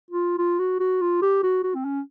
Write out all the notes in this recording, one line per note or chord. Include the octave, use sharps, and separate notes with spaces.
F4
F4
F#4
F#4
F4
G4
F#4
F#4
C4
C#4